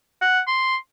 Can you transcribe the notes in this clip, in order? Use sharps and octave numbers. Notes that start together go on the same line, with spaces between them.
F#5
C6